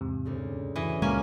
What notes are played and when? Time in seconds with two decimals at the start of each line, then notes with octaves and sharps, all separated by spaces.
0.01 E2 G#2 C3
0.25 D2 C#3
0.76 F#2 E3 D#5
1.02 C#2 A#2 G#3 A#3 C#4 G#5